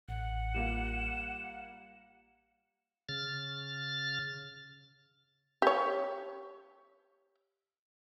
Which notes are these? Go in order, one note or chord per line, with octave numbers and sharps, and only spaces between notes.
A1 F#5
G3 A#3 F4 E7
C#3 F6 A6
G4 C#5